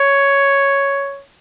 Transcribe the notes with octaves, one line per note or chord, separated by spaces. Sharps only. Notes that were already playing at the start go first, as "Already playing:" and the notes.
Already playing: C#5